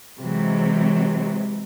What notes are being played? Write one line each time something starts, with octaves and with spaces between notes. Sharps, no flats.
C3 E3 F#3 G#3